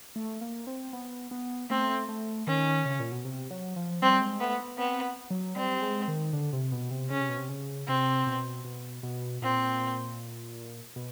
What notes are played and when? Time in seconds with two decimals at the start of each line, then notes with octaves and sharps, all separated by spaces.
0.16 A3
0.41 A#3
0.67 C4
0.93 B3
1.31 B3
1.70 A3 C4
2.09 A3
2.47 D#3 C#4
2.85 C#3
3.00 A#2
3.12 B2
3.25 C3
3.51 F#3
3.76 F3
4.02 G3 C4
4.21 G#3
4.40 A3 B3
4.60 B3
4.78 B3 C4
5.30 F#3
5.56 G3 C4
5.82 G#3
6.08 D#3
6.33 D3
6.53 C3
6.72 B2
6.91 C3
7.10 C#3 C#4
7.20 C3
7.29 B2
7.38 C3
7.49 C#3
7.87 C3 C4
8.27 B2
8.65 B2
9.03 B2
9.42 A#2 C4
10.96 B2